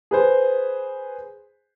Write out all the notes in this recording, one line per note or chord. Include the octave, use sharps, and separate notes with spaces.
G#4 B4 C5